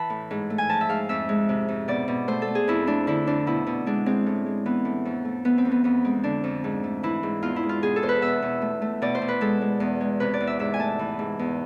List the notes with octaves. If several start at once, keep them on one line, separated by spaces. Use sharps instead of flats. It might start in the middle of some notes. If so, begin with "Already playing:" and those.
Already playing: E3 A5 B5
A2
G#2
A3
G#5
F3 A5
E5
G#2 F5
F2 E5
G#3
C3
F2
B2 D5
B2
A3 C5
A4
A3
G#4
F2 E4
A3 D4
D3 E4
F2 D4
B2 E4
B2
G#3 D4
G#3 C4
A2
G#3
E3 B3
A2
F2
A3
E3 B3
C4
F2
B3
F2 B3
G#3 C4
D3 D4
F2
G#2
A3
E3 E4
G#2
E2 F4
E4
G#3
F4
B2 G#4
A4
E2 C5
B4
B2 E5
B2
A3
A3
B2 D5
C5
B2
B4
G#3 A4
G#3
E2
G#3
C3 B4
D5
E2
E5
G#2 E5
G#5
A3 A5
E3
G#2
E2